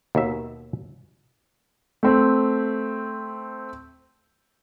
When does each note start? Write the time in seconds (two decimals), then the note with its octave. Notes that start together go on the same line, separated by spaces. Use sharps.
0.15 D#2 B2 E5
2.03 A3 C4